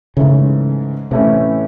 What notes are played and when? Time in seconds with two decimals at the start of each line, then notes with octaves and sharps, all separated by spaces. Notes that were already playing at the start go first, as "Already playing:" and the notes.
0.17 G#2 C#3 E3 A3 C#4
1.11 A2 C3 E3 A3 C#4 E4